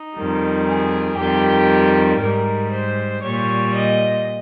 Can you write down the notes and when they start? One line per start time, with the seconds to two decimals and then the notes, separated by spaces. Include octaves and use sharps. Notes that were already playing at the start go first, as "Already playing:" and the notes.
Already playing: D#4
0.15 F2 D#3 G3
0.67 G#4
1.17 F2 D#3 G3 G4
2.20 G#2 G3 A#4
2.71 C5
3.22 A#2 G3 C#5
3.74 D#5